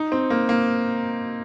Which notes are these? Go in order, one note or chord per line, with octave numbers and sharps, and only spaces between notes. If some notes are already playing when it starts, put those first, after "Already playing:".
Already playing: D#4
C4
A#3
A#3